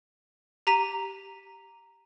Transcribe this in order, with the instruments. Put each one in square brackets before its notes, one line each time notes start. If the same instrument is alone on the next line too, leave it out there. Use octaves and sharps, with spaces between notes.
[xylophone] G4 A#5 B6 D#7